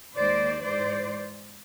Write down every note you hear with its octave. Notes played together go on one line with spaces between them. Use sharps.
D#2 D#3 G#3 C5 D5
G#2 E3 G#3 C5 D5